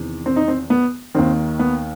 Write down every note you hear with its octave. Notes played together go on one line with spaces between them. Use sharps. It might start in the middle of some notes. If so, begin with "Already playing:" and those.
Already playing: E2 C3 D#3
C4
D#4
C4
B3
D#2 D#3 C4
B3